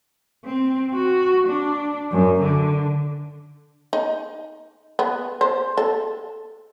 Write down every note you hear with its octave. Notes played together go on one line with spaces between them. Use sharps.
C4
F#4
D4
F#2
D3
D#4
B3
C5
A4